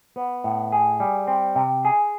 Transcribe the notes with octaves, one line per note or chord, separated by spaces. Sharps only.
B3
A2
G#4
G3
C4
C3
G#4